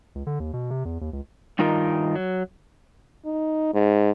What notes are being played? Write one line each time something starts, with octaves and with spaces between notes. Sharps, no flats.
C#2
D3
D#2
B2
C3
E2
D#2
C#2
G2 D#3 D#4 F4 A#4
F#3
D#4
G#2